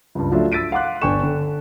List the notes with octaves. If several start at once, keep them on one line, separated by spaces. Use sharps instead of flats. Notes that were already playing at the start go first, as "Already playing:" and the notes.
C#2 G2
F3 F#3 A3 D4 F4 E5
E6 A6 B6 D7 D#7
F5 F#5 C6 D6 F#6
G1 D4 G5 G#5 C#6 E7
D3